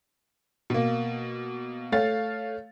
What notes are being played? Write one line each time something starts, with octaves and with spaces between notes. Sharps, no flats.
B2 A#3
A3 C#5 F5 A6